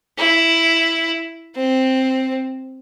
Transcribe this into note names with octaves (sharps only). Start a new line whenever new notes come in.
E4
C4